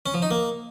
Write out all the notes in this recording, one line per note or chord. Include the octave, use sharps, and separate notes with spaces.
C#4
F3
D#4
A#3